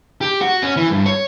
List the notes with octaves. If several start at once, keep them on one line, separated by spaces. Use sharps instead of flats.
G4
F#4
C#4
E3
G2
C#5